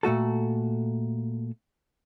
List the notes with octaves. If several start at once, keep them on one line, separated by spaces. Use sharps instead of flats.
A#2 A3 F#4 A4